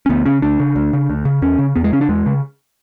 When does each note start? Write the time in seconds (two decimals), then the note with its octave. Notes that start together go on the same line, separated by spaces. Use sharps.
0.06 C#4
0.09 D2 B3
0.25 C#3 C#4
0.42 D2 D4
0.60 C#3
0.76 D2
0.93 C#3
1.10 D2
1.25 C#3
1.42 E2 C#4
1.59 C#3
1.76 E2 B3
1.84 G#3
1.92 C#3 C#4
2.01 D4
2.09 E2 G#3
2.26 C#3